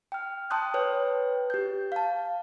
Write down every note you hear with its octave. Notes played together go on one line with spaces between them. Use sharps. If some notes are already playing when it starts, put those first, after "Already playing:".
G5 F6
G5 A5 C6 D#6 F#6 G6
B4 C#5 G5
G4 G6
F5 A5